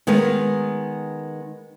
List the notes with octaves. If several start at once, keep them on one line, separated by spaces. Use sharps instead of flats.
D#3 G#3 B3 A#4 B4